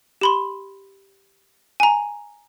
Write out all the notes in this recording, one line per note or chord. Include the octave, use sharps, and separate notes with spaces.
G4 B5 C6
G#5 A#5